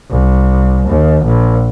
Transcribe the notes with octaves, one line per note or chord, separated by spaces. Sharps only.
C2
D#2
A#1